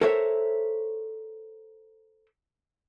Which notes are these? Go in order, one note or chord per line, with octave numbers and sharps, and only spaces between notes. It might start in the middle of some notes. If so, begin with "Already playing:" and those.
A4 A#4 C5 C#5 E5